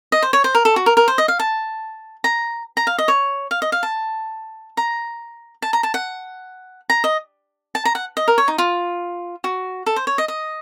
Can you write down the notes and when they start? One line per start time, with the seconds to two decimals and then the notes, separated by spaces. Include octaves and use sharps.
0.12 D#5
0.22 C5
0.33 C#5
0.44 C5
0.55 A#4
0.65 A4
0.76 F#4
0.86 A#4
0.97 A#4
1.08 C5
1.18 D#5
1.28 F5
1.39 A5
2.24 A#5
2.77 A#5
2.87 F5
2.98 D#5
3.08 C#5
3.51 F5
3.62 D#5
3.72 F5
3.83 A5
4.77 A#5
5.62 A5
5.73 A#5
5.83 A5
5.94 F#5
6.90 A#5
7.04 D#5
7.75 A5
7.85 A#5
7.95 F#5
8.17 D#5
8.28 A#4
8.38 C#5
8.48 D#4
8.58 F4
9.44 F#4
9.86 A4
9.96 C5
10.07 C#5
10.18 D#5
10.28 D#5